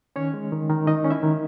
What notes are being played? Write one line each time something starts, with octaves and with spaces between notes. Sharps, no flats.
D#3 C#4 C#5
G#3
D#3
D#3
D#3 D#4 D#5
C#4
E4 E5
D#3